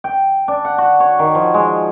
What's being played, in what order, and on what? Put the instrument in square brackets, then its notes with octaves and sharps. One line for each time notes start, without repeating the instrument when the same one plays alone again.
[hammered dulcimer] G5
D4
F#5
F#4
C#5
D#3
F3
G#3